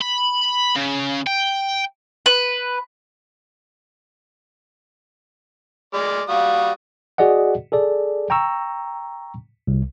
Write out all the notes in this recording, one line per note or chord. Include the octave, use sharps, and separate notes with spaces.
B5
C#3
G5
B4
G#3 D5 F6
G3 F#4 F5 D#6
F#4 G#4 D5 D#5 F#5
G#4 A4 D5
G5 A#5 C#6 E6
C2